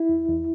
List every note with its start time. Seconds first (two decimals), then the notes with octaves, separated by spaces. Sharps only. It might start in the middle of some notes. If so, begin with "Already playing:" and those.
Already playing: E4
0.09 E2
0.28 E2